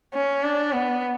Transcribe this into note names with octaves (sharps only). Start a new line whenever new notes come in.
C#4
D4
B3